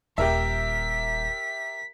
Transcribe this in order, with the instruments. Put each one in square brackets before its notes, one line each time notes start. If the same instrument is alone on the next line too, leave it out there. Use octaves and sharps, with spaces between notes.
[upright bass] D#1 [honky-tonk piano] G4 A#4 E5 [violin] B6